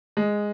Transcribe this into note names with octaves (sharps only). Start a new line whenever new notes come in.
G#3